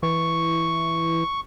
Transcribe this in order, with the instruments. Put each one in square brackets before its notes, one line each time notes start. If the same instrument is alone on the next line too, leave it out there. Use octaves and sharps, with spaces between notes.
[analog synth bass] E3 [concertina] C#6